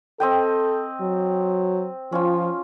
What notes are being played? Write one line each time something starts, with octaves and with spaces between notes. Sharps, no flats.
C4 A4 D#5 G5
F#3
F3 C#4 F4